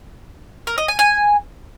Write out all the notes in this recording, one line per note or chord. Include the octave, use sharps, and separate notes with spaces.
A#4
D#5
G#5
G#5